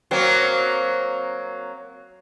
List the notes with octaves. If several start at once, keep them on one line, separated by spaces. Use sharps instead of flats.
F#3 A#3 C4